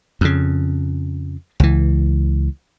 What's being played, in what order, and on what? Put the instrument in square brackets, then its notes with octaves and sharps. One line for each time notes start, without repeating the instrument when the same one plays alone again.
[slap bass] F2 C#3
C#2 E3